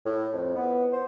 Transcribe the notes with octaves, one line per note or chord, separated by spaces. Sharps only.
A2
F2
B3
C5